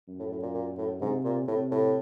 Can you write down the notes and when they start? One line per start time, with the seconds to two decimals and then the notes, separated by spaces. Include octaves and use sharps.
0.08 F#2
0.19 A2
0.31 A2
0.43 A#2
0.54 A#2
0.78 A2
1.01 G#2 C3
1.24 A#2
1.48 A2 C3
1.71 A2